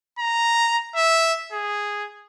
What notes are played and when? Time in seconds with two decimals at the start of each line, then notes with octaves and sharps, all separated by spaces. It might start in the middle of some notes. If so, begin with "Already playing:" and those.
0.19 A#5
0.96 E5
1.53 G#4